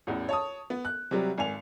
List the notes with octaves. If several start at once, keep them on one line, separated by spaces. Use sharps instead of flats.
A1 E2
C#5 A5 D#6
B3
F#6
C3 F#3 G3
G#1 G#5 F7